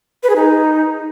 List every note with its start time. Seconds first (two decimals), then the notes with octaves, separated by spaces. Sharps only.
0.23 B4
0.30 G#4
0.36 D#4